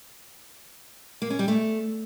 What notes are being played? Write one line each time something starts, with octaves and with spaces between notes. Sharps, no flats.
A#3
C#4
G3
A3